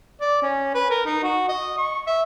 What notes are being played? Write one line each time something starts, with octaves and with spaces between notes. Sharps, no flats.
D5
C#4
B4
A#4
D#4
F#4
D#5
C#6
E5